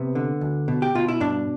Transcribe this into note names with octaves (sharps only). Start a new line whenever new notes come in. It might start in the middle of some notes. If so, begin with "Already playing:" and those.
Already playing: C3 B3
D3
D2
B2
G4
B2 F4
E4
G2 D4